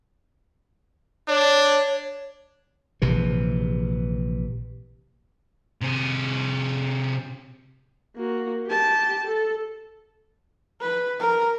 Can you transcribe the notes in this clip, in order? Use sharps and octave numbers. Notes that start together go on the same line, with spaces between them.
D4 C#5
A#1 C3 E3
C3 G#4
A#3 F#4
G4 A5
A4
B4
A#4